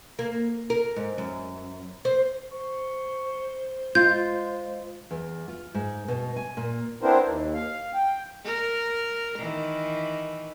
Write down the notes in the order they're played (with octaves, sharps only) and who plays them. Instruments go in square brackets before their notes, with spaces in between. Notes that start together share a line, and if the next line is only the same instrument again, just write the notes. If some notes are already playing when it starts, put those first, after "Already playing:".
[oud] A#3
A#4
G#2
F#2
C5
[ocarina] C5 [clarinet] C#6
[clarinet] G#3 [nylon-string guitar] F4 [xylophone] G6
[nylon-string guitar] E2
F4
G#2
B2
G#5
A#2
[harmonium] B3 C4 D4 E4 A#4 C5
D#2
F5
G5
[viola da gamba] A#4
D#3 E3